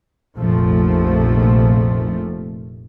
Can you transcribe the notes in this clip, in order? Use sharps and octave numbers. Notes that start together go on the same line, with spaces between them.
F1 A#1 F3 A3